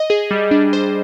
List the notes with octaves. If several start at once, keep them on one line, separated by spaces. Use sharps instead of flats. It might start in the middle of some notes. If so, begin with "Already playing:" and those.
Already playing: D#5
G#4
G3
D4
C5